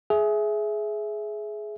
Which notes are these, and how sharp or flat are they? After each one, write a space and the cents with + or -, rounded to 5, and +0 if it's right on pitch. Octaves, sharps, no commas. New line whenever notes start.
G#4 +20 E5 +0